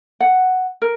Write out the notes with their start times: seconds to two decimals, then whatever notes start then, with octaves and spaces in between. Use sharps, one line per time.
0.20 F#5
0.82 A#4